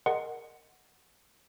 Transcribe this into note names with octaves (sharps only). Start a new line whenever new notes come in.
G#4 A#4 D#5 F#5 C6